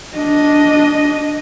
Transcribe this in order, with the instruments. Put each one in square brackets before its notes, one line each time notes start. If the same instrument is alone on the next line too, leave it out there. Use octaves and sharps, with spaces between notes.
[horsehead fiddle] D4 D#5